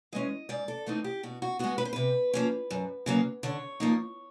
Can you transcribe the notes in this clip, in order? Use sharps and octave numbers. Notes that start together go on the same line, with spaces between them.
E3 G#3 C#4 D#5
G#2 D5
A4
E3 A3 C4 D#4
G4
B2 F#4
F#4
G#3 B3 F#4
B4
C5
C3 B4
F3 A#3 C#4
F#2
C#3 F#3 A#3
D3 C#5
F3 A#3 D#4